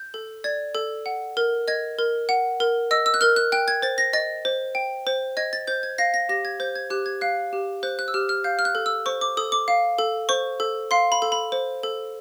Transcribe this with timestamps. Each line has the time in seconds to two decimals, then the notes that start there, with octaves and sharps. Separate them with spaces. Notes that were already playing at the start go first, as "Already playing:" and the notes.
Already playing: G6
0.14 A4
0.44 D5 G#6
0.75 A4
1.06 F#5
1.37 A#4
1.68 D#5 G#6
1.99 A#4
2.29 F#5
2.60 A#4
2.91 D#5 E6
3.06 E6
3.14 F#6
3.21 A#4 F6
3.36 F#6
3.52 G5 F#6
3.68 G#6
3.82 C5 A6
3.98 A#6
4.13 D#5 A6
4.45 C5
4.75 G5
5.07 C5
5.37 D#5 G#6
5.53 A6
5.67 C5 G6
5.83 G#6
5.98 F5 A#6
6.14 A#6
6.29 G4 A#6
6.45 G#6
6.60 C5 G6
6.75 G#6
6.90 G4 F#6
7.06 G#6
7.21 F5 F#6
7.53 G4
7.83 C5 F#6
7.99 F#6
8.08 E6
8.14 G4 F6
8.29 F6
8.44 F5 G6
8.59 F6
8.65 F#6
8.75 A4
8.86 E6
9.06 C5 C#6
9.21 D6
9.37 A4 D#6
9.52 D6
9.68 F5
9.99 A4
10.29 C5 C#6
10.60 A4
10.91 F5 C6
11.12 B5
11.22 A4
11.32 B5
11.52 C5
11.83 A4